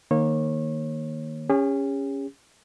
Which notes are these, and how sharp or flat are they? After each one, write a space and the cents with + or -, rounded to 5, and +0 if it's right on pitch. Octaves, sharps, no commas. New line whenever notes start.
D#3 -10 A#3 +0 C#5 -30
C#4 +0 G#4 -45